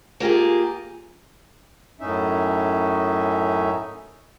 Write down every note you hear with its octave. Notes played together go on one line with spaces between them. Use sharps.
A#3 F4 G4 G#4
F#2 A2 C#4 D#4 E5